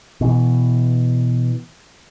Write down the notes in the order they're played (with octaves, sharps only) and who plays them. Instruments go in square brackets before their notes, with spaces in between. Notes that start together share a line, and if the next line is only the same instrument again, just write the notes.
[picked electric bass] B2 E3